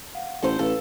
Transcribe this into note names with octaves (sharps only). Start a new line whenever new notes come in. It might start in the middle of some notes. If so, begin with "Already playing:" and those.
F5 F#5
A1 A4 C5
A1 A4 B4 F5